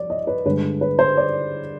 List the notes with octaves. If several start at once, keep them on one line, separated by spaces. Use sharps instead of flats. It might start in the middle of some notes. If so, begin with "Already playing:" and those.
Already playing: F3 D5
D#5
B4
G2 D3 G#3 D4 B4
B4
C5
D5